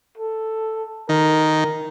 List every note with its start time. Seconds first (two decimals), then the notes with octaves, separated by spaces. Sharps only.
0.18 A4
1.09 D#3 A#4